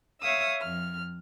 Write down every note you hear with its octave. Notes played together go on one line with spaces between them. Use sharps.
C#5 E5 F5 D#6 E6
F2 F6